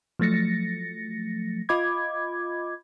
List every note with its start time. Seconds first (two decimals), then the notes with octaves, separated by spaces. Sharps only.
0.19 F3 F#3 A3 A6 A#6 C#7
1.69 F4 D#5 B5 D6 G#6